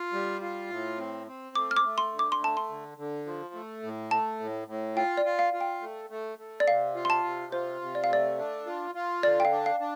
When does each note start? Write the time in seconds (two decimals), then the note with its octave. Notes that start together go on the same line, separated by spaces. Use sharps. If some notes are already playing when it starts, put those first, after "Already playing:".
Already playing: F4
0.13 G3
0.42 F4
0.70 A2
0.98 C4
1.27 C4
1.55 A3 D6
1.71 F6
1.77 D6
1.84 A3
1.98 C6
2.12 D3
2.19 D6
2.32 C6
2.40 A3 A5
2.57 C6
2.69 D3
2.98 D3
3.26 F3
3.54 A3
3.83 A2
4.11 A3 A5
4.40 A2
4.68 A2
4.96 F4 G5
5.17 D5
5.25 F4
5.39 F5
5.53 F4
5.61 G5
5.81 A3
6.10 A3
6.39 A3
6.60 D5
6.67 C3 F5
6.95 F4
7.05 C6
7.10 A5
7.24 C3
7.52 F4 C5
7.81 C3
7.95 D5
8.04 F5
8.09 A3 D5
8.38 D4
8.66 F4
8.95 F4
9.23 D3 D5
9.40 G5
9.45 F5
9.52 D4
9.66 F5
9.80 D4